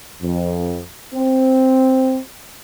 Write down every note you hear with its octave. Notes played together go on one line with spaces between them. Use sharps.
F2
C4